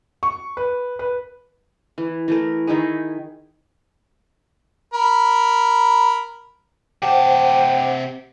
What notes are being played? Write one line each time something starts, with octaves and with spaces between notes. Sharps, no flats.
C#6
B4
B4
E3
E3 A3 A#4
D#3 D#4 E4 G#4
A#4 B5
C3 G4 C5 F#5 A5